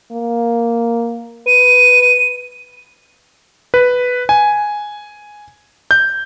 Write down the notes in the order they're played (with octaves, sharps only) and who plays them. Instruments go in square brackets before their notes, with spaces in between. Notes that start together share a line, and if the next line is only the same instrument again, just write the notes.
[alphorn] A#3
[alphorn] B4 [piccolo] D#7
[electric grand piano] B4
G#5
G6